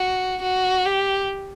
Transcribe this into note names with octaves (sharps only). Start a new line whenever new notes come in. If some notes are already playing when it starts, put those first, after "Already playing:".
Already playing: F#4
F#4
G4